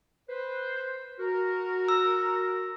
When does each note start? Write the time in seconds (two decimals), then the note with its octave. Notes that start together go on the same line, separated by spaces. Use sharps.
0.29 B4 C5
1.19 F#4 A#4
1.89 E6